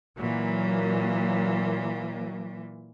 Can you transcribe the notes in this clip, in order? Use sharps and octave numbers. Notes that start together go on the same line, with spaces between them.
A#2 E3 F#3 A#3